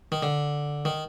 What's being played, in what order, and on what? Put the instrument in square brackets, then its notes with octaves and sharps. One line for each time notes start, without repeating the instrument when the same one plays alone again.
[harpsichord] D#3
D3
D#3